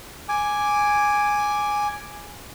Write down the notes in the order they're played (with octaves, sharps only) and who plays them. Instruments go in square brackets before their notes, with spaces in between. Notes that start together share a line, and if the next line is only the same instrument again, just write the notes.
[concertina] G#5 D6